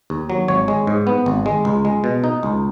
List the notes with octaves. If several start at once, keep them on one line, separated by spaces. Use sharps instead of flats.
D#2
F#3
G#1 C#5
G#3
G#2
B3
G#1
G#3
C#2
G#3
B2
D#4
C#2